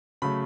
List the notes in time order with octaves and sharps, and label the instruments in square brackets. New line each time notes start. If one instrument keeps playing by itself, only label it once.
[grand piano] C#3 F#3 A3 B5